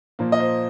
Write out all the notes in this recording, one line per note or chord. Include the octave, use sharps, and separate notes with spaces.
A#2 F3 A#3
D#5
C5